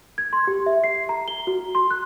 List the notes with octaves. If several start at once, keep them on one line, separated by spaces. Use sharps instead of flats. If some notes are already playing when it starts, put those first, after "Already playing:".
G#6
C6
G4
E5
C7
A#5
G7
F#4
C6
F#6